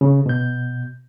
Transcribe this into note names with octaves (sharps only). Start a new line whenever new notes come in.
C#3
B2 G6